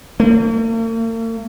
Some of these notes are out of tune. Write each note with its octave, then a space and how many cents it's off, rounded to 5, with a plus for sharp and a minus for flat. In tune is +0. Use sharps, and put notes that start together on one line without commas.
A#3 -45